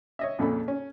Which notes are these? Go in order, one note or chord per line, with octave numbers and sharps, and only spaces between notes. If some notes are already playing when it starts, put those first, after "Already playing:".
C#5 D#5 E5
F2 A#2 C#3 A4 B5
C#4